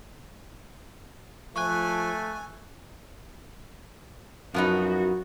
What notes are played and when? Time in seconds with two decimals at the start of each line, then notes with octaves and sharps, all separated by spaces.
1.56 F3 A3 G#5 C#6 F#6
4.54 F#2 F3 B3 D#4 F#4